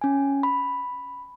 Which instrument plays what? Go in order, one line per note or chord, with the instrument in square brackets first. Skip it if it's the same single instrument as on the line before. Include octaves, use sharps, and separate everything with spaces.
[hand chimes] C#4 G#5
B5